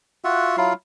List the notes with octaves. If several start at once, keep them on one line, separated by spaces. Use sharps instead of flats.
F4 F#4 E5 F#5
F#3 E4 F4 F5